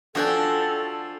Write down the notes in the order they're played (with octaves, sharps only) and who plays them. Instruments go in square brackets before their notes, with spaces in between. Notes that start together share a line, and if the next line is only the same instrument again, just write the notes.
[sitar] F3 D4 [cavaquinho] F#4 G5 G#5 [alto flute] A4